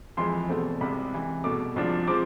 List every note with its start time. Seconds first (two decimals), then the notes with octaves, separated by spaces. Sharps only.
0.17 F2 E3 G#3 C6
0.48 E2 B2 A3 C4
0.81 C2 C3 G#3 B5
1.12 C3 E3 G#3
1.44 C2 B2 A3 D6
1.76 C2 C3 F3 G#3 D4
2.08 F3 G#3 C4 D6